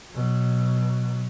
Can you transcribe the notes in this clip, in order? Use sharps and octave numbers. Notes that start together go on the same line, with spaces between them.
B2 F#3